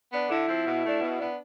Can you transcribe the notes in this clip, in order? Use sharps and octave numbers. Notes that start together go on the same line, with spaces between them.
B3 D4
D3 E4
F3 C4
B2
A3 D4
B2
B3 D4